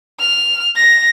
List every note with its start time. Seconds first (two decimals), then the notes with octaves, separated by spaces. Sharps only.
0.20 F6
0.76 A#6